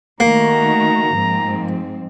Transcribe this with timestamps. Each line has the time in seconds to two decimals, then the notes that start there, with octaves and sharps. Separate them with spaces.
0.20 D#3 A3 A#3 F#4 A#5
1.16 G#2 F3 C4